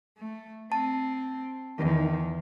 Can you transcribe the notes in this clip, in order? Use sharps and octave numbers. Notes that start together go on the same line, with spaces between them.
A3
C4 A5
E2 D#3